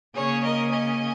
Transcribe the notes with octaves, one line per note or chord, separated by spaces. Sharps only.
C#3 A#3 C#4 G#4 C#5
A#4 D#5
D#5 G#5